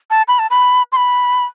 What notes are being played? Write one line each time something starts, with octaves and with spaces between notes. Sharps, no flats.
A5
B5
A5
B5
C6
B5